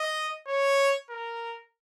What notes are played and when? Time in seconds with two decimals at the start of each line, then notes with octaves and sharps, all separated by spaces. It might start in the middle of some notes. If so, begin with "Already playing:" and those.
Already playing: D#5
0.47 C#5
1.10 A#4